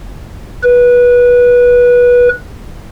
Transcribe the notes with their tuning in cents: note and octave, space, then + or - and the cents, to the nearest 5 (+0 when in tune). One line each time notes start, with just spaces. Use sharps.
B4 -20